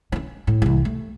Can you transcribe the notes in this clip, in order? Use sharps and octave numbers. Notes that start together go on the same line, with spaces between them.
C4 C#4
A2
C2 E3
A3